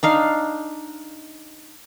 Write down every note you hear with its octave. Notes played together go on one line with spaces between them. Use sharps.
D4 D#4 F5